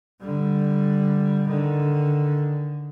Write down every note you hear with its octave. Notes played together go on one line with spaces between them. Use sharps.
D3 G3
D3 D#3